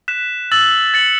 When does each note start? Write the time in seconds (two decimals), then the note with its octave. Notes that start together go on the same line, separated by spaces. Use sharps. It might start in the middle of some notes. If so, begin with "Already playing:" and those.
0.08 F#6 B6 E7
0.51 E6 A6 F#7
0.94 A6 C#7 F#7